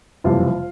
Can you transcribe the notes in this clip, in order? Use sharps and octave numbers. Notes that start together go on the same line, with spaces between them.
F#1 F2 C3 E3 G3 F4